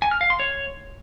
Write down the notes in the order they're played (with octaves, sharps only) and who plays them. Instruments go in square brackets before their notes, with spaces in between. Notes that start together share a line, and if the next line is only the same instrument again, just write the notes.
[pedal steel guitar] G#5
F6
F5
C6
C#5